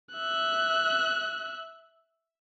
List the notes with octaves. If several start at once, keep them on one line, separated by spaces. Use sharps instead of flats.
E5 F#6